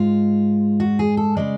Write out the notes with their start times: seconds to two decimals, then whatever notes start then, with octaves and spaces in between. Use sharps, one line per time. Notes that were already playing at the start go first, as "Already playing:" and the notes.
Already playing: G#2 G#3 F4
0.80 F#4
0.99 G#4
1.17 A4
1.37 C#3 F3 G#3 D5